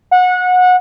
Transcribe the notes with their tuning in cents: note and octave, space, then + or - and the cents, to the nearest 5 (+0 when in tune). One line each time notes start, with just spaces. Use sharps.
F#5 -25